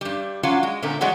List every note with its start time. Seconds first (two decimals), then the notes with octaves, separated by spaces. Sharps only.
0.01 G2 G3
0.43 F#3 C#4 D4 F4 F#4
0.63 G#3
0.82 A#2 D3 A3 C4 C#4 A#4
1.01 E3 F#3 G#3 C#5 D5 F#5